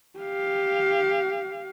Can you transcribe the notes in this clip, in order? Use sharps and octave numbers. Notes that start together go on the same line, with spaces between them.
G4 F5